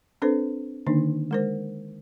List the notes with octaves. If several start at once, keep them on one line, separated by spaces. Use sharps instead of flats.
C4 D4 A4 B4 C5
D3 D#3 A#3 D4 D#4
G#3 A#4 C5